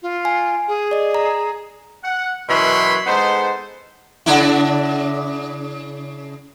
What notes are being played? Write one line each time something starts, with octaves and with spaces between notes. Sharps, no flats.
F4
G#5
G#4
D5 D#5
A#5
F#5
F#2 B2 E3 C#5 B5 C6
G#3 B3 D#4 A4 C5
C#3 D4 E4